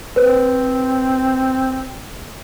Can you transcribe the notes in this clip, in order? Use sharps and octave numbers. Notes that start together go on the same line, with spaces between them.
C4 B4 C5